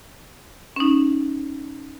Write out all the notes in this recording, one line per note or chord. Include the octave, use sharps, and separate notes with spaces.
C#4 D#4